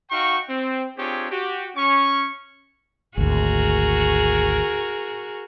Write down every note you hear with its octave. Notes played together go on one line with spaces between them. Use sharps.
D#4 F#4 F5 G5 C#6
C4
C4 D4 F4 G4 G#4 C#5
F#4 G4
C#4 C#6
G#1 D2 F#4 G#4 A#4